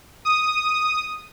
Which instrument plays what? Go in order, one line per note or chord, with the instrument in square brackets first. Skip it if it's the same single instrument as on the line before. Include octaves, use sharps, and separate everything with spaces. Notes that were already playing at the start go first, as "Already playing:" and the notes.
[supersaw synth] D#6